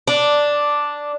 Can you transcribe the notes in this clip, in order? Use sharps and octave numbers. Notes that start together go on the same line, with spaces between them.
D4